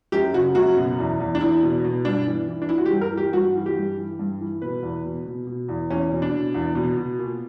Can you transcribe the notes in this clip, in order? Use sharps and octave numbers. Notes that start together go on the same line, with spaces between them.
F#2 G4
C#3 F#4
F#2 F#4
B2
E2
E2
D4
E2 E4
B2
B2
G2 D4
E3
E3
D4
E3 E4
F#4
G4
G2
A#4
E3 G4
G2 F#4
E3
G4
G2
E3
G2
E3
B2 B4
E2
B2
B2
B2
E2
E2 C#4
B2
D4
B2
E2
B2
B2
A#2